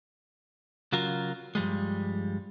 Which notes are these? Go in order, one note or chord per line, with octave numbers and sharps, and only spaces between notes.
C#3 F#3 F4 A#4
G2 F3 G3 G#3